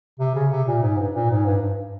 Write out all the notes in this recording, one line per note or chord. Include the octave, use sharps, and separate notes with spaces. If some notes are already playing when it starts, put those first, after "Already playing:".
C3
C#3
C3
A#2
G#2
G2
A#2
G#2
G2
G2